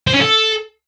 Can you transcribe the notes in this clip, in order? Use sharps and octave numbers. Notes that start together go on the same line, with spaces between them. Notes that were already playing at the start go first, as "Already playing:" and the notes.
C5
C#4
A4